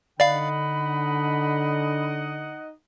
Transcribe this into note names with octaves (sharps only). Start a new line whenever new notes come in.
D3 D#4 D5 D#5 F5 F#5 B5